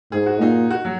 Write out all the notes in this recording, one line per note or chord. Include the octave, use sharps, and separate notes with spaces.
G#2 G#4
F#4
A#2 D#4
F#4
F#3